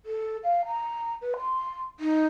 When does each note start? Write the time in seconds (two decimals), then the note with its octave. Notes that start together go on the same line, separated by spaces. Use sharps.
0.06 A4
0.44 F5
0.66 A#5
1.21 B4
1.37 C6
2.00 D#4